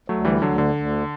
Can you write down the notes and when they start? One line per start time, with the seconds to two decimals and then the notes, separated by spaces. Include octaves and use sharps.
0.08 D2 F#3 A3
0.25 E3 G3
0.42 D2 D3 F#3
0.58 D3
0.74 D2